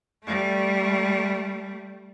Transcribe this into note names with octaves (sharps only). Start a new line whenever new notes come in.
G3 A3